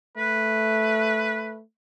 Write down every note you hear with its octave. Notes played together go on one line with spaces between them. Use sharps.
A3 B4